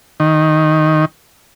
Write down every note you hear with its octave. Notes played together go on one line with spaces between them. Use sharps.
D#3